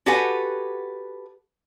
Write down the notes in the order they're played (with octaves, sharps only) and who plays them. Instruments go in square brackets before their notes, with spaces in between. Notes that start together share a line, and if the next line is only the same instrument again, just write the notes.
[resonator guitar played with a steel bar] F#4 G4 A4 B4 F#5 G#5